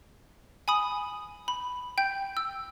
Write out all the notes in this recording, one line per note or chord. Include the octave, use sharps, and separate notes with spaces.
G#5 B5 D#6 F#7
B5
G5 G6
E6